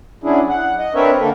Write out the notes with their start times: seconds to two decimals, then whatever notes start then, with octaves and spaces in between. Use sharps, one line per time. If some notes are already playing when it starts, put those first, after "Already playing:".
0.24 F#3 C#4 D4 E4 G#4
0.49 F#5
0.79 D#5
0.95 C4 D4 A#4 B4 C#5 E5
1.20 D3 A#3 A4